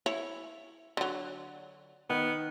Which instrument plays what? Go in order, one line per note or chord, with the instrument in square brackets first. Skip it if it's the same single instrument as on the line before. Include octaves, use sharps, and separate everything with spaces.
[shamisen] E4 C#5
D3 F#3
[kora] D#3 [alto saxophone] B3